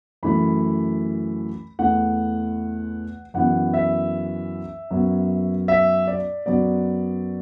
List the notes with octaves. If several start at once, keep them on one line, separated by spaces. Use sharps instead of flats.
F#2 E3 A3 B5
E2 E3 A3 F#5
F#2 E3 B3 F#5
E5
F#2 F#3 B3
E5
D5
F#2 F#3 B3 D5